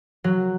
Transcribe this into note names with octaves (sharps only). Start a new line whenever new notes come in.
F#3